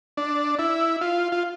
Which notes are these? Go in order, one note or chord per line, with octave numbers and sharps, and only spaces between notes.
D4
E4
F4
F4